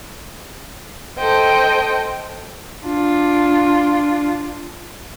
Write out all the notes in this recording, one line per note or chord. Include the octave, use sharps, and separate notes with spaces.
A4 C5 D#5 G5
D4 F4